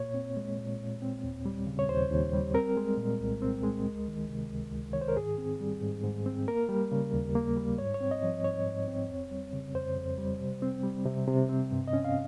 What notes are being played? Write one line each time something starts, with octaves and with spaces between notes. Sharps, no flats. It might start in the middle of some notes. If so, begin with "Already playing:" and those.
Already playing: A#2 A#3 C#5
C4
G#3
A#2
A#2
C4
D#2
G3
C#3
C#5
D#2 C5
D#2
G3
C4 A#4
G#3
A#2
C2
C4
G#3
C#2
D#3
C3
C#2
C#2
D#3 C#5
C5
A#4
G#2 G#4
C4
G3
G#2
G#2
C4
A#3 A#4
G3
C#3
D#2
A#3
G3
G#2 C#5
C#5
C4
D#5
F3
G#2 C#5
G#2
C4
F2
G3
C#3
F2 C5
F2
G3
C3
C4
G3
C3
C3
C4
G2
D#5
C#4
F5